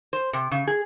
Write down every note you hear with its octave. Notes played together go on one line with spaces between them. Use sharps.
C5
C3
C#3
G#4